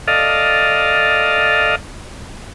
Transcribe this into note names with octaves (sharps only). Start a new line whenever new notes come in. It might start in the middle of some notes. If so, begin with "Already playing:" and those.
A4 D5 D#5 F5